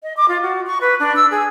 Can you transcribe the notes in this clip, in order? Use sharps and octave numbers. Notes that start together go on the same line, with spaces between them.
D#5
D6
F4
F#4
C#6
B4
D4
E6
G#4